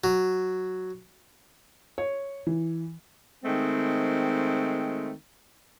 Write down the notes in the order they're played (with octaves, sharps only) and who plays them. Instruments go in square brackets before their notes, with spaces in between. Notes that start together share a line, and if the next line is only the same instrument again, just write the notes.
[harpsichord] F#3
[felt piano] C#5
E3
[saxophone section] D#3 G#3 A3 C4